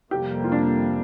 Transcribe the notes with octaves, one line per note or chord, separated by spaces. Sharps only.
F2 C3 G3 A#3 G4
F4
D4